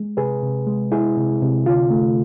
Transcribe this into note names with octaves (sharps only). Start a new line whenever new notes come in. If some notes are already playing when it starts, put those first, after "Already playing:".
Already playing: G#3
C3 G#4 B4
C3
G#3
G#3 E4 G#4
C3
C3
D3 F4
A3